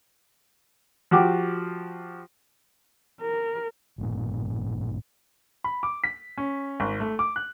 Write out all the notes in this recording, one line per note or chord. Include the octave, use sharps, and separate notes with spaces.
F3 F#4 G4 D6
A#4
A1 G2 A#2
B5
D6
B6
C#4
G#1
A3
D6
F#6